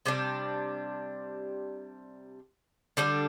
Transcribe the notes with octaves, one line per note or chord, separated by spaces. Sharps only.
C3 G3 D4
D3 G3 D4